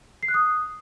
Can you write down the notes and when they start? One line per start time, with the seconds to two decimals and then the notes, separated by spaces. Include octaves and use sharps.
0.23 C7
0.28 F#6
0.34 D#6